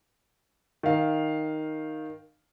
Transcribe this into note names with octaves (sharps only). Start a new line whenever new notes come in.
D#3 F5